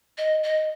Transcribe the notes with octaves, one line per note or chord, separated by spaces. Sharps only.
D#5
D#5